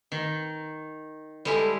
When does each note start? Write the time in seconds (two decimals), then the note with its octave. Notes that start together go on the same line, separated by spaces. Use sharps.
0.12 D#3
1.45 G3 G#3 E4 A4